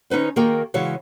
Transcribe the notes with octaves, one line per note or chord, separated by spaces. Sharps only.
D#3 C#4 D#4 B4 C5
D#3 A#3 F#4 G#4 A#4 G5
C#3 E3 G#3 F#4 C#5 F5